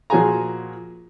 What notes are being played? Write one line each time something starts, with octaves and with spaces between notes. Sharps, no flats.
A#2 F3 F#4 G#4 G#5 A#5